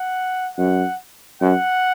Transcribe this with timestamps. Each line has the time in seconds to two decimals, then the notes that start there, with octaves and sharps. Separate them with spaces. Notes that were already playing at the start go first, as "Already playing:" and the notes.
Already playing: F#5
0.57 F#2 F#5
1.41 F#2 F#5